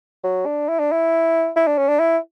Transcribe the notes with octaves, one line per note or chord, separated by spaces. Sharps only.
F#3
D4
E4
D4
E4
E4
D4
C#4
D4
E4